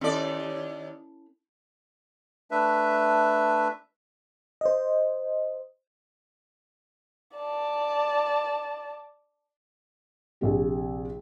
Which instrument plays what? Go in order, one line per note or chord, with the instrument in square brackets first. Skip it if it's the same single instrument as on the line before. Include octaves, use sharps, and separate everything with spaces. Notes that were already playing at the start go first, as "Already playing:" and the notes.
[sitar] D#2 D5 [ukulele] C#4 E4 A4
[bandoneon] A3 D4 B4 E5
[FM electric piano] C5 D#5
[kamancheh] D5 A5
[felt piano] A#1 C3 G4